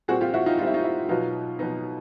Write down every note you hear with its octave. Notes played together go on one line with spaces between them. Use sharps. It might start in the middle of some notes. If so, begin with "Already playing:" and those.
A#2 G3 C4 F#4 G#4
F4 G4
E4 F#4
D#4 F4
A#2 G3 C4 F4
E4
D#4 F4
E4
B2 F#3 B3 D#4 F4
B2 F#3 B3 D#4